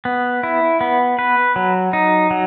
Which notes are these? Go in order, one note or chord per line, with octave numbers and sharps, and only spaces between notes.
B3
E4
B3
B4
F#3
D#4
F#3